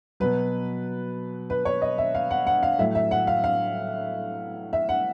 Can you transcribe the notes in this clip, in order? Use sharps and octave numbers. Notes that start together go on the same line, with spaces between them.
B2 F#3 B4
B4
C#5
D#5
E5
F5
F#5
F#5
F5
A2 F#3 E5
E5
F#5
F5
F5
E5
F#5